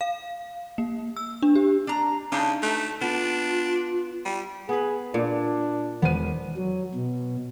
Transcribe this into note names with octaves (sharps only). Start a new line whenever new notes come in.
F5
A#3
E6
D4
G4
D4 A#5
C#3 D4 D#4
A3
B3 D4 F4
G3
B3 G#4 B4
A#2 D4
E1 B3 C5 D#7
F#3
B2